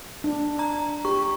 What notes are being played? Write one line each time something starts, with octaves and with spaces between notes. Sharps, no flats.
D4
A#5
G4 C#6